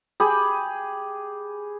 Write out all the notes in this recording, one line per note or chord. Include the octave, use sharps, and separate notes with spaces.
G4 G#4 B5